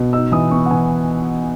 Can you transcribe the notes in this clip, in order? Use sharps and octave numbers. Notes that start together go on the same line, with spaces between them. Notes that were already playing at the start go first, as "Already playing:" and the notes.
Already playing: B2
D#4 E6
E3 D#6
B3 C#6
F#5
E3 G#5